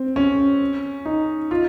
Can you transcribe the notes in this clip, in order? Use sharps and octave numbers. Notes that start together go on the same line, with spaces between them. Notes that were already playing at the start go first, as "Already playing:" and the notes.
Already playing: C4
C#4
D#4
F4